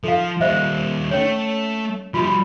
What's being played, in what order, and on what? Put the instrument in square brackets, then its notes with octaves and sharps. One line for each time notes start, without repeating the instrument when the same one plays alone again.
[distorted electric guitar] F3 [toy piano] A4 F5
[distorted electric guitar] D#2 G3 [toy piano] C5 D#5 E5
[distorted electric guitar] A3 [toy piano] C#4 C#5
[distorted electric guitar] F3 G3 [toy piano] F4 F#4 B5